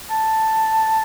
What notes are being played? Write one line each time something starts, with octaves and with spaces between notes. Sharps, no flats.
A5